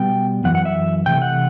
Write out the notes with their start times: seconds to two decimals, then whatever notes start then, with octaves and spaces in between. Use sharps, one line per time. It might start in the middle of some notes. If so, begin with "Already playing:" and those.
Already playing: B2 G3 B3 G5
0.44 F#2 E3 F#5
0.55 F#5
0.65 E5
1.06 C3 E3 A3 G5
1.22 F#5